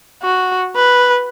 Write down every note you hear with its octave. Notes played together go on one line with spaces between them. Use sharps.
F#4
B4